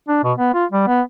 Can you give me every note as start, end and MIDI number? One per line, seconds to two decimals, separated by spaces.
0.09 0.19 62
0.24 0.32 47
0.38 0.52 59
0.54 0.65 65
0.72 0.85 55
0.87 1.01 59